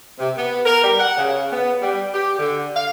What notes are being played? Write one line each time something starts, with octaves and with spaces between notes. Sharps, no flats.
C3
B3
A#4
G3
F#5
C#3
B3
G3
G4
D3
F5